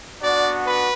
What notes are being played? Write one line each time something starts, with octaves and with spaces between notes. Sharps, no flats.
B3 D4 F#4 D5
B4